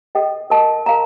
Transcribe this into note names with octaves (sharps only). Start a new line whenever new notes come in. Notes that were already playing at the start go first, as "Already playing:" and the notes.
A4 D#5 G5
A#4 D#5 A5
A#4 F5 A#5